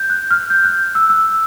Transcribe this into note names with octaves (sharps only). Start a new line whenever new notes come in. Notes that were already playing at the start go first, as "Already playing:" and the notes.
Already playing: G6
F#6
F6
G6
F#6
E6
E6